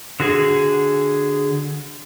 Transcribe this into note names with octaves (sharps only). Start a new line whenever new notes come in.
D3 F#4 G#4